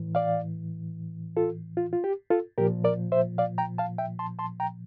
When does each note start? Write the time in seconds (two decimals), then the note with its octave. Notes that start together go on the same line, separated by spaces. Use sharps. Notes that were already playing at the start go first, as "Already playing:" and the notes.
Already playing: A2 E3
0.15 D5 F5
1.37 F4 A4
1.77 F4
1.93 F4
2.04 G4
2.30 F4 A4
2.58 A#2 F3 G4 A#4
2.84 A#4 D5
3.12 C5 E5
3.38 D5 F5
3.58 G5 A#5
3.78 F5 A5
3.98 E5 G5
4.19 A5 C6
4.39 A5 C6
4.60 G5 A#5